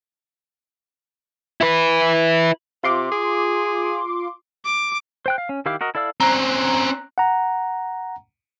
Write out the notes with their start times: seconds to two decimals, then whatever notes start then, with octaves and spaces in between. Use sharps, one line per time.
1.61 E4 B4
2.84 C3 F4 C6 D6
3.12 G#4
4.65 D6
5.26 C5 G5 F#6
5.38 F5
5.49 C#4
5.66 D#3 E4 G4 F5 D6
5.81 F#4 A#4 D#5
5.95 E4 A4 D5 F5 E6
6.20 C4 C#4 A#5 F#6
7.18 F#5 A#5